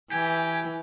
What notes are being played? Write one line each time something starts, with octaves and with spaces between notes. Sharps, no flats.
E3 G4 G#5